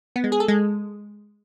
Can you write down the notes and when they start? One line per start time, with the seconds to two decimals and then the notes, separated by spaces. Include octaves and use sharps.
0.16 B3
0.24 G#3
0.32 G#4
0.40 A4
0.48 G#3